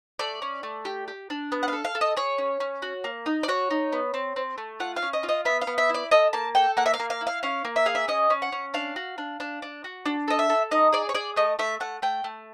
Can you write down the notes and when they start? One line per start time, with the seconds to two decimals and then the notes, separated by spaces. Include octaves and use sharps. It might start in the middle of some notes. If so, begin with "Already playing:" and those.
0.19 A3 D5
0.42 C#4
0.63 A3
0.85 G4
1.08 G4
1.30 D4
1.52 B3
1.63 F#5
1.68 A4 F5
1.84 F5
1.95 A4
2.01 D#5
2.17 G#4 C#5
2.38 C#4
2.60 C#4
2.82 F#4
3.04 A#3
3.26 D#4
3.43 D5
3.48 F#4 C#5
3.71 D#4
3.93 B3
4.14 C4
4.36 C4
4.58 A3
4.80 F4 F#5
4.96 F5
5.02 C#4
5.13 D#5
5.23 F4
5.29 D#5
5.45 B3 E5
5.61 F5
5.67 B3
5.78 E5
5.89 E4
5.94 D5
6.11 A4 D#5
6.33 A#3 A5
6.55 A4 G5
6.77 A#3 F#5
6.86 E5
6.94 F5
7.00 A#3
7.10 F5
7.21 E4
7.27 F5
7.43 C#4 F5
7.65 A#3
7.76 E5
7.86 G#4 F5
7.95 E5
8.08 C#4 D#5
8.30 C#4
8.42 F#5
8.52 C#4
8.74 D4 F5
8.96 F#4
9.18 D4
9.40 D4
9.62 D4
9.84 F#4
10.06 D4
10.28 A4 D#5
10.39 E5
10.50 A4
10.71 D#4 D#5
10.93 G#4 D5
11.09 C#5
11.15 G#4 D5
11.36 A3 D#5
11.59 A3 E5
11.80 A3 F#5
12.02 A3 G5
12.24 A3